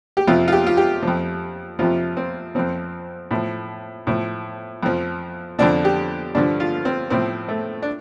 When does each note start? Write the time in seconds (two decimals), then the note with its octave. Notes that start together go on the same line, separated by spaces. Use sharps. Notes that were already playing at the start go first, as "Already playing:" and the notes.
0.17 G4
0.27 F2 C3 F3 F4
0.48 F4
0.52 G4
0.67 F4
0.77 G4
1.03 F3
1.08 F2
1.79 F2 C3 F3 F4
2.17 C4
2.55 F2 F3 C4
3.31 A2 F3
4.07 A2 F3
4.83 F2 F3
5.59 F2 D3 F3 D4
5.85 G4
6.35 G2 D3 F3 D4
6.60 F4
6.85 C4
7.10 A2 F3 C4
7.48 A3
7.82 D4